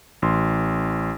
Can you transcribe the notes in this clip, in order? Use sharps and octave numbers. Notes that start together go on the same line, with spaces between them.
A1 C6